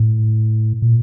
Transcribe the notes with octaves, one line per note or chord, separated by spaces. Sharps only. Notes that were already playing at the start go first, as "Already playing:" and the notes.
Already playing: A2
A#2